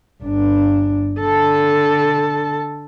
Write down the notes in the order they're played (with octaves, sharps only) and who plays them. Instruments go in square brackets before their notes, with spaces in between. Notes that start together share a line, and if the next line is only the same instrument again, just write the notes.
[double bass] G1 D4
[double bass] D3 [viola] A4 A5